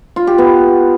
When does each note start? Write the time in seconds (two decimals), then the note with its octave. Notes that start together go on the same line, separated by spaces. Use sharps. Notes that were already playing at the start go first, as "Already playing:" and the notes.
0.16 F4
0.27 G4
0.38 B3